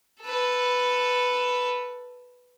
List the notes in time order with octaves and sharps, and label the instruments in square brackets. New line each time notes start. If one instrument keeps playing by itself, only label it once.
[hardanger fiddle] A4 B4